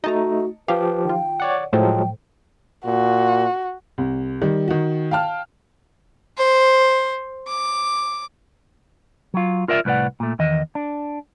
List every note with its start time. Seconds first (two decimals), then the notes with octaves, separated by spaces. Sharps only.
0.04 A3 D#4 F#4 D#5 A5 A#5
0.68 F3 G4 B4 F5
1.05 D#3 F4 G5
1.40 C#5 D5 F#5
1.73 A2 F3 F#3 G#3 A4 C5 G5
2.85 A#2 F#4
3.98 C2
4.42 D#3 G3
4.68 D#3 F#4
5.11 F5 G5 A5 F6
6.38 C5
7.47 D6
9.34 F#3 F4
9.68 F4 A#4 D5 E5
9.85 C2 A2 B4 D5 F#5
10.20 A#2 A3
10.39 E2 D#3 D#5
10.75 D4